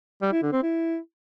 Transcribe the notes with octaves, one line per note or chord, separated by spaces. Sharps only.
G3
E4
D3
C4
E4